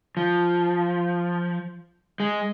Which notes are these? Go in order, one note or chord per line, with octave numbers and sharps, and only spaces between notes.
F3
G#3